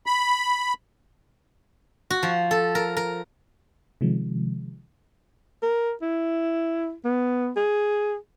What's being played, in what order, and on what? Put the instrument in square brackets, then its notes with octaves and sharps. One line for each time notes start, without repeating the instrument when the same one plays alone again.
[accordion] B5
[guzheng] F#4
F3
A4
A#4
A#4
[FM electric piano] C3 D#3 F3 G#3
[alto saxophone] A#4
E4
B3
G#4